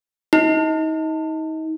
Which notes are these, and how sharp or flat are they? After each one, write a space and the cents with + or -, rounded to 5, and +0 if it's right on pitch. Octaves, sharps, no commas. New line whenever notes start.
D#4 +30